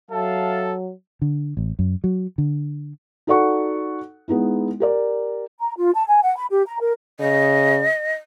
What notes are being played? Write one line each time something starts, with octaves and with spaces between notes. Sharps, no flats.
F#3 A4 E5 F5 A5
D3
A1
F#2
F#3
D3
D#4 F#4 A4 D5 F#5 C#6
G#3 B3 D#4 E4
G4 A#4 D5
A#5
F4
A5
G#5
F#5
B5
G4
A#5
A#4
C#3 D#5